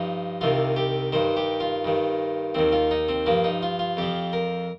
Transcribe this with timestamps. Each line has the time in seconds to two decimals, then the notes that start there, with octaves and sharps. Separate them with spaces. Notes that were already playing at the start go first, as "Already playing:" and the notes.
Already playing: G2 F3 D#4
0.41 C2 C3 D#3 F4
0.76 G4
1.13 G2 D#3 C5
1.37 G4
1.60 F4
1.84 G2 D#3
2.55 D#2 D#3 C4
2.72 F4
2.91 D#4
3.09 C4
3.26 G2 F3 A#3
3.44 D#4
3.63 F4
3.79 F4
3.97 F2 F3 G4
4.33 A#4